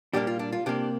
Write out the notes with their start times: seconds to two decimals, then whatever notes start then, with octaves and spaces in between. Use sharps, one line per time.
0.13 A#2 G3 A#3 D4 G4
0.27 F4
0.39 D4
0.52 F4
0.66 C3 A#3 D4 G4